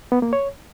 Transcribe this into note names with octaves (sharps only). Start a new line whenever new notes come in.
B3
A#3
C#5